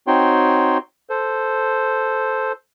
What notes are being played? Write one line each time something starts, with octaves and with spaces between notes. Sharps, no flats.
C4 D#4 F#4 C#5 G5 C6
A4 C5